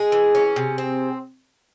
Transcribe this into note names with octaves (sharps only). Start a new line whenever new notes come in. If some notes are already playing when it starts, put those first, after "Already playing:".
Already playing: G#3 G#4
E3
C#4
C3
C4